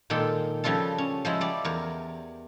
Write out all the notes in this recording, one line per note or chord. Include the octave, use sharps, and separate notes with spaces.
A#2 D#3 G#3 A4 G5
C#3 F3 G3 F4 A4
C#4
F3 G#3 E4
G3 D5
E2 A#4